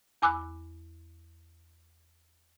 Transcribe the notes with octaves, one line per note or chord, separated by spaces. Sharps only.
E2 G#5 B5 D6 E6 F#6